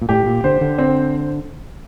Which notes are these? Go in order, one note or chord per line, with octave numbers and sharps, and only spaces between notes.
A#2
A2 G4
A#2
D3 C5
D3
C4